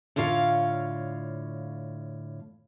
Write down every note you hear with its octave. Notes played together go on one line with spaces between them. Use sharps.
A2 D3 F4 C#5 F5